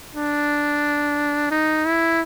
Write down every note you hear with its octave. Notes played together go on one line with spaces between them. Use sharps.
D4
D#4
E4